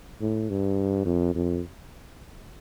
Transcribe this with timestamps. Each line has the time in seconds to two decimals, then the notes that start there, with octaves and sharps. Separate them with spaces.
0.21 A2
0.50 G2
1.06 F2
1.35 F2